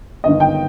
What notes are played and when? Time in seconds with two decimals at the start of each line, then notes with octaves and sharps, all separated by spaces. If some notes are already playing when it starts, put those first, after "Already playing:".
0.24 G1 G2 D#3 D#5
0.40 G5